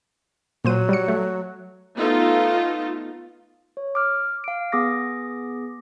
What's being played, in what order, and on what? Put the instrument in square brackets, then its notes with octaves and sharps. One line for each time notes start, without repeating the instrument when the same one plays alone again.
[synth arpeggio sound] A#2 C5 D#7 [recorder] F#3
[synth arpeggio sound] G3 C#7
A3
[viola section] A3 B3 D#4 F4 A4
[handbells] C#5
D6 F6
F5 D7
B3 G#4 D6 D#6 A#6